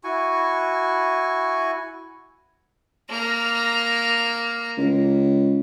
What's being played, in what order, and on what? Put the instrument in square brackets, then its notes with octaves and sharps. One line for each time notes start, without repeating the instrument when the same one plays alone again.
[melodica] E4 F#4 G#5 C#6
[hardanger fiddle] A#3 A#5
[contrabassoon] C#2